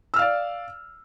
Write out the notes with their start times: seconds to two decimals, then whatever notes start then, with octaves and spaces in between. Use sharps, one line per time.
0.14 E6
0.16 F6
0.19 F5
0.22 D5